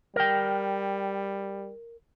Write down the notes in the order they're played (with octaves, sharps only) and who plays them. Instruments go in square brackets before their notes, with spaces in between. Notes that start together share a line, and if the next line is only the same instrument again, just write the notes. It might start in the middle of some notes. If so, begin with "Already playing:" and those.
[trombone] G3 [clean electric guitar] A#4 G5